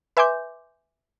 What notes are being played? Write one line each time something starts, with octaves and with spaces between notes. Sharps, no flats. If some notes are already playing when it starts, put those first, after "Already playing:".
B4 E5 G#5 C6 D6 G6